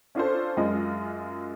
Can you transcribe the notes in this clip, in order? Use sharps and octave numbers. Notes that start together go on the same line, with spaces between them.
C#4 D4 F4 A4 C5
F#2 G#3 F4 D#5